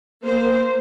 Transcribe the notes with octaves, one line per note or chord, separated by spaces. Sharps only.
A#3 C5